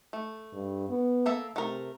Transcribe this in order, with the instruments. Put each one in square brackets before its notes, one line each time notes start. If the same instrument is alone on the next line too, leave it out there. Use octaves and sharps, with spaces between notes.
[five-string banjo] A3
[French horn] G2
B3
[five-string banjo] A#3 A4 E5
[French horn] C3 [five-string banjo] A3 A#4